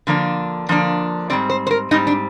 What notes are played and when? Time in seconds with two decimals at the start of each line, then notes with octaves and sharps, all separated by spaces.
0.07 D3 F3 A#3 D4
0.69 D3 F3 A#3 D4
1.30 G#2 G3 C4 D5
1.50 C5
1.67 C5
1.71 A#4
1.91 G#2 G3 C4 D#4
2.07 D4